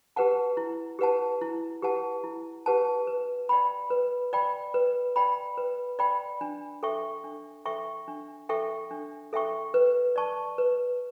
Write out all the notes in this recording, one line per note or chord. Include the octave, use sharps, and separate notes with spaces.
G4 B4 F#5 A5
E4
G4 B4 F#5 A5
E4
G4 B4 F#5 A5
E4
G4 B4 F#5 A5
B4
D5 G5 B5
B4
D5 G5 B5
B4
D5 G5 B5
B4
D5 G5 B5
D4
A4 E5 G5 C#6
D4
A4 E5 G5 C#6
D4
A4 E5 G5 C#6
D4
A4 E5 G5 C#6
B4
D5 A5 C#6
B4